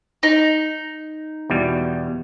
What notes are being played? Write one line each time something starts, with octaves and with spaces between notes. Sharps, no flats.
D#4
E2 B2 G3